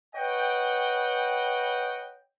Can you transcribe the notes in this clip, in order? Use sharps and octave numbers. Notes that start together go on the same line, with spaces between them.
B4 C#5 D#5 F#5 G5